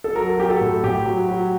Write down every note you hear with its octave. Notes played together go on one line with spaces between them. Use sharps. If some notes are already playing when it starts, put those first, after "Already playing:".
A4
F#3 A#4
F#3 G4
A4
A2
A2 G4
F#3
F#3